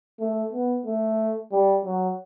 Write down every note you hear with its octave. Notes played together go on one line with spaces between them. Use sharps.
A3
B3
A3
G3
F#3